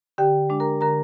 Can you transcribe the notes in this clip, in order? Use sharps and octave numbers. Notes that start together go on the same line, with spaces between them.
D3 G4 G5
G#3 D4
A#4 A#5
D3 A#4 A#5